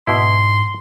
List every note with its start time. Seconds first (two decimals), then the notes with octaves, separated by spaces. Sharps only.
0.07 G#2 B2 E4 C6